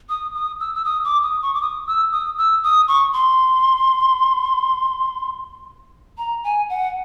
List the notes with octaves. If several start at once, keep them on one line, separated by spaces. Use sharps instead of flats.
D#6
D#6
E6
E6
D#6
D6
D#6
C#6
D6
D#6
E6
D#6
E6
D#6
C#6
C6
A#5
G#5
F#5